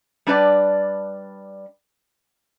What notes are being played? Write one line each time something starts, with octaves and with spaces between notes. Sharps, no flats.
G3 D4 B4 D5